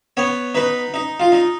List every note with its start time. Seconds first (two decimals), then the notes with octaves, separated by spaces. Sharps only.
0.17 B3 C#5
0.55 D#4 B4
0.94 D#4
1.20 F4
1.32 D#4